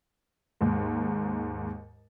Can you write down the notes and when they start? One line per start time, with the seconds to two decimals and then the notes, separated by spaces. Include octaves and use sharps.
0.61 D#2 G#2